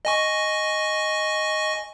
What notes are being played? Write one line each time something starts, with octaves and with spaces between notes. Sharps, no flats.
D#5 G#5 C#6